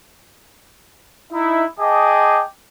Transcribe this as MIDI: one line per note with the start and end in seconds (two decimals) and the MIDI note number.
1.33 1.64 63
1.33 1.64 64
1.79 2.42 68
1.79 2.42 75
1.79 2.42 79
1.79 2.42 81
1.79 2.42 86